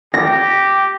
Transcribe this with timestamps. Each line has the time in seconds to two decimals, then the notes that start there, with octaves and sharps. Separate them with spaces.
0.14 G4 A#6